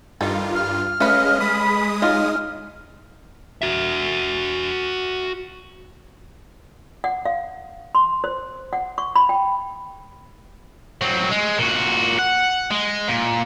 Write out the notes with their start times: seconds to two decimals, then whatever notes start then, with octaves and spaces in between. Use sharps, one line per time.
0.21 G2 D#3 G3 F4 A4
0.55 F6
1.00 G#3 A3 C#4 B4 D#5 F5
1.40 G#3 B5 D#6
2.02 F#3 D#4 F4 D#5 F6
3.62 F#4 E5
7.04 F#5
7.25 F5
7.95 C6
8.24 C5
8.73 F#5
8.98 C#6
9.16 B5
9.29 G5
11.01 F#3 C4
11.31 G#3
11.59 A#2 F#4
12.19 F#5
12.71 G#3
13.09 A#2